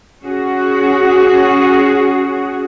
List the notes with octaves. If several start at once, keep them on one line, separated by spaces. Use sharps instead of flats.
C#4 F#4 G#4